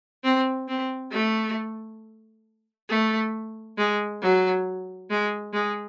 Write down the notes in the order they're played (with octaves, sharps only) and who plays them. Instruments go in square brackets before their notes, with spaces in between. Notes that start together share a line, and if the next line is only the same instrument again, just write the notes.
[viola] C4
C4
A3
A3
G#3
F#3
G#3
G#3